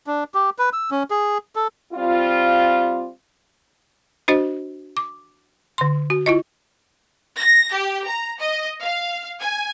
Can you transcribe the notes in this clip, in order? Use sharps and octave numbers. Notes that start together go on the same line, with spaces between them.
D4
G4
B4
E6
C#4
G#4
A4
G3 C4 F4
D4 F#4 C5 D#5
D6
D3 C6
F#4
E4 F4 D#5
A#6
G4
A#5
D#5
F5
G#5